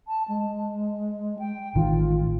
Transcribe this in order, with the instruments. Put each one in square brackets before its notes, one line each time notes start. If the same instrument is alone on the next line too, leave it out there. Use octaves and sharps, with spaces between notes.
[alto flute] A5
G#3
G5
[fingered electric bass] A1 D#3 [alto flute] F4